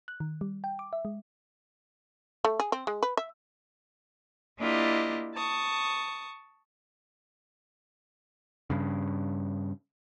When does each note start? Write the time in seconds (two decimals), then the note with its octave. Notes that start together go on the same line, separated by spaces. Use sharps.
0.08 F#6
0.20 D#3
0.41 G3
0.64 G5
0.79 D6
0.93 E5
1.05 G#3
2.45 A3
2.60 G#4
2.72 C4
2.87 G#3
3.03 B4
3.17 E5
4.59 A#3 D4 E4 F4 G4 D#5
5.35 A5 C#6 D#6
8.70 G2 C#3